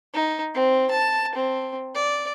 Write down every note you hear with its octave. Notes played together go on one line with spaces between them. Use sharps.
D#4
C4
A5
C4
D5